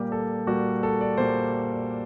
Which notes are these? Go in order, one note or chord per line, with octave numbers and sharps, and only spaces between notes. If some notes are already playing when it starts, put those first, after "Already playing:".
Already playing: A#2 G3 A#3 G4
A4
A#2 G3 A#3 F#4
A4
D5
A#2 G3 A#3 C5